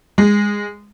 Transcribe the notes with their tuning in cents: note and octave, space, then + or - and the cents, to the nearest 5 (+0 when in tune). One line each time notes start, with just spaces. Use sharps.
G#3 -15